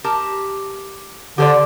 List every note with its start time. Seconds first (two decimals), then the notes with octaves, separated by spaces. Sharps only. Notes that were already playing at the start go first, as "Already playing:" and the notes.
0.04 G4 A#4 A5
1.38 D3 G4 C5 D5